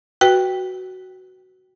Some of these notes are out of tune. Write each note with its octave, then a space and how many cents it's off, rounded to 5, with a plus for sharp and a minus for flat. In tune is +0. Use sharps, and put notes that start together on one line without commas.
F#4 +10 B4 +0 G5 +0